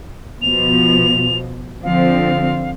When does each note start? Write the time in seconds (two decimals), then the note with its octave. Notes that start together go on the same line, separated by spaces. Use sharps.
0.42 B2 F3 F7
1.84 D3 F3 C4 F5